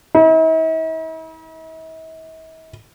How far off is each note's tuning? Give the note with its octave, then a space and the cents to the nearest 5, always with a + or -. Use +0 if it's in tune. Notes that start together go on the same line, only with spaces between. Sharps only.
E4 -45